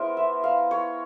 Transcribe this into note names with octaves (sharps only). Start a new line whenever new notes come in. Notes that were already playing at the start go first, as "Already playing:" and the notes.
Already playing: G#3 B3 E4 A#4 C5
E5
F5
C#5